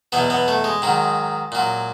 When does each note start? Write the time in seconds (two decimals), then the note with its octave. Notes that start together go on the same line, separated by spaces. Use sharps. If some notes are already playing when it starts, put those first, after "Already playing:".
0.12 E2 B2 F#3 B3
0.30 B3
0.48 A3
0.64 G#3
0.82 G#2 D#3 F#3
1.52 A#2 F#3